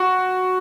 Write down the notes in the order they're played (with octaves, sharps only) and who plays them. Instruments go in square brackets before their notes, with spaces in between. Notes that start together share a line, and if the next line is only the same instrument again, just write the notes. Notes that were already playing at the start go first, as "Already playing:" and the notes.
Already playing: [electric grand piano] F#4